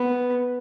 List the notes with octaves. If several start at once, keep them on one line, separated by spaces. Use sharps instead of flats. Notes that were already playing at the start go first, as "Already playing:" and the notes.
Already playing: B3